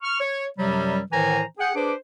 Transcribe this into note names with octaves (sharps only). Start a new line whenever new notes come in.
C#6 F6
C#5
F#2 C3 F#3 G3
A2 D#3 E3 C5 G#5 A#5
G#4 F#5 G5
D4 G#4 B4 C5 D6